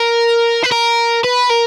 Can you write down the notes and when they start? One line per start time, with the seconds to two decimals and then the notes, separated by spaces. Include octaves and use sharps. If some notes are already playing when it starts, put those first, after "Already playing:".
Already playing: A#4
0.63 B4
0.71 A#4
1.24 B4
1.51 A#4